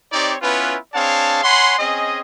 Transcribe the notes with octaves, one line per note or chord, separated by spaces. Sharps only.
C4 D#4 G4 C#5 D5
B3 C#4 E4 F4 B4
C4 D4 G#4 C#5 F5 A5
C#5 F#5 G#5 B5 C6
C4 C#4 G#4 D#5